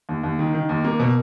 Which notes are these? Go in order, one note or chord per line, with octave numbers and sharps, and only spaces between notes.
D#2
D#2
D#3
D#3
D#2
A#3
B2